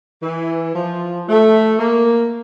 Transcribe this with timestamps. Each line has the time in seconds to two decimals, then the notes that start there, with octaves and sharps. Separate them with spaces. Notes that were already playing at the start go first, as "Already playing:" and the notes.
0.23 E3
0.75 F3
1.28 A3
1.79 A#3